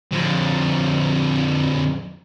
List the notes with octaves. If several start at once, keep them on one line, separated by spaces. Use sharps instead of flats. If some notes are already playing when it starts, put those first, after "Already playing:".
F2 D3